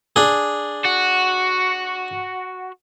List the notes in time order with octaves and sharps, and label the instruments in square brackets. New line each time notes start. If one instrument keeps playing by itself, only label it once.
[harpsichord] D4 G#4
[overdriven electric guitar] F#4